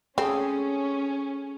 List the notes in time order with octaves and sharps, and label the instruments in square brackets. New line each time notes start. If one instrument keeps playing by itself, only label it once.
[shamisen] C4 [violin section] C#4 [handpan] G#4 A4